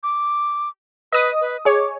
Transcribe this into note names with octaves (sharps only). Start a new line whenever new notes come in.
D6
B4 D#5 D#6
B4
G#4 C#5 D6